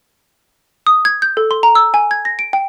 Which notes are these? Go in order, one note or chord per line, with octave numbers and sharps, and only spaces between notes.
D#6
G#6
G6
A4
C6
A#5
E6
G#5
G#6
A#6
D7
G5